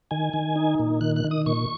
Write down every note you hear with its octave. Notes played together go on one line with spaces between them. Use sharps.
D#3 G#5
D#3
D#4
A#2
D#3 F#6
F#6
D#3
D#6
A#2 C#6